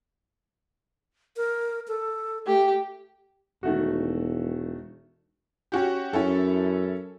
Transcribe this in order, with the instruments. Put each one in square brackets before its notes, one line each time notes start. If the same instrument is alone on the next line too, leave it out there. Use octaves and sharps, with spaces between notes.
[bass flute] A#4
A4
[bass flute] A3 [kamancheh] G4
[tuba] E1 [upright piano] D#3 A3 F#4
[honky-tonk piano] C#4 F#4 G4
[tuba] F#2 [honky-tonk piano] C#4 E4 A4